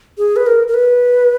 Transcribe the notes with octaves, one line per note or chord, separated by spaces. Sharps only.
G#4
B4
A#4
A#4
B4